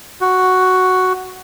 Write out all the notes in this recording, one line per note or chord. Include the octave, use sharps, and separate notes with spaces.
F#4